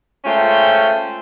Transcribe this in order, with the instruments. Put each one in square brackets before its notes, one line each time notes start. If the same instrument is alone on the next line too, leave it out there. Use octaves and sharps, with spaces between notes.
[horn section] G#3 A3 C#4 F4 C5 G5